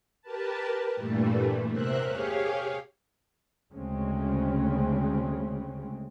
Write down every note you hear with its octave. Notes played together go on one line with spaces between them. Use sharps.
G4 A#4 B4 A5
G2 A#2 E3 G3 A3
E2 C3 A#4 C5 E5 F#6
G4 G#4 C#5 F5
D2 C#3 G#3 A3 C4 C#4